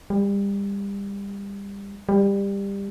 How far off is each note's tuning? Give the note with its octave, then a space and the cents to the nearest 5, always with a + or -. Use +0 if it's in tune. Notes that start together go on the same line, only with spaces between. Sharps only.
G3 +30
G3 +20